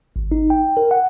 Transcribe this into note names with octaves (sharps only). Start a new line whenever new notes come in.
G#1
D#4
G5
A#4
F#5